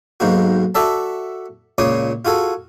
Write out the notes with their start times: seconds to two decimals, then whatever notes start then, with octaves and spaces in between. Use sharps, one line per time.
0.20 B1 G#2 A#3 F#4
0.75 F#4 A4 D5 E5 A5
1.78 C#2 A#2 C#5 C6 D6 D#6
2.25 F4 F#4 G#4 A4